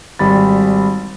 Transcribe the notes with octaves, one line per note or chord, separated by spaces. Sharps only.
G#1 G3 B5 A6